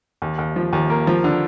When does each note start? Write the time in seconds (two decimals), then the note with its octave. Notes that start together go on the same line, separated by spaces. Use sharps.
0.22 D#2
0.39 D#2
0.56 F3
0.73 D#2
0.90 A#3
1.07 F3
1.24 D3